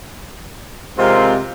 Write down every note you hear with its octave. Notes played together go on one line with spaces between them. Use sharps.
C3 G#3 C4 F4 A#4